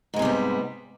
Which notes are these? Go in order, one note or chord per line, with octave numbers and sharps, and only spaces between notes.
G#2 C3 G3 G#3 B3